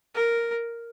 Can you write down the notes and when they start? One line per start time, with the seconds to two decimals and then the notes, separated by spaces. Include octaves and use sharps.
0.14 A#4